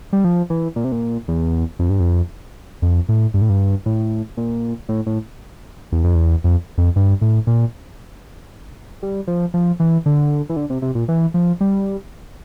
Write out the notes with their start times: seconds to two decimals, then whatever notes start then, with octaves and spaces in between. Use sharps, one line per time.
0.13 G3
0.24 F3
0.50 E3
0.76 A#2
0.84 C3
0.92 A#2
1.28 E2
1.79 F2
1.90 G2
2.00 F2
2.82 F2
3.09 A2
3.34 G2
3.42 A2
3.49 G2
3.86 A2
4.37 A#2
4.89 A2
5.06 A2
5.92 E2
6.04 F2
6.15 E2
6.44 F2
6.78 F2
6.96 G2
7.21 A2
7.47 A#2
9.03 G3
9.27 F3
9.54 F3
9.80 E3
10.06 D3
10.49 E3
10.56 D3
10.70 C3
10.82 C3
10.95 A#2
11.08 E3
11.34 F3
11.61 G3